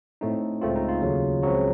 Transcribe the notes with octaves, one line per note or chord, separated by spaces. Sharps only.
A2 A3 C4 D#4
C#2 C#3 A3 C4 F4
D#4
F4
D#2 C#3 F#3
C#2 C#3 F3 F#3 C4 F#4